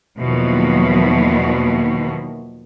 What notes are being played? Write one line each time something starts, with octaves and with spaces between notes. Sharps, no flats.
E2 B2 D#3 F3 F#3 A#3